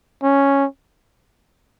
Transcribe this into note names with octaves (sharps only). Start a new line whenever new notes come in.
C#4